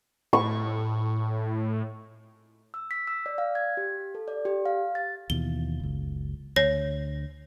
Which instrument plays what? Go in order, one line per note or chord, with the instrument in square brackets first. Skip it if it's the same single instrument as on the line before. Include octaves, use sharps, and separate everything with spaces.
[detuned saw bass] A2 [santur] C#6
[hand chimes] E6
B6
E6
D5
F5
G#6
G4
A4
D5
G4
F5
A6
[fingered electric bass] D#2 B2 E3 [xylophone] G7
[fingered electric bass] F#1 C#2
[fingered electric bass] D2 [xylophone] C#5 A#6 C7